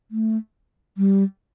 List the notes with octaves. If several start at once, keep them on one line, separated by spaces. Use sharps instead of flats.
A3
G3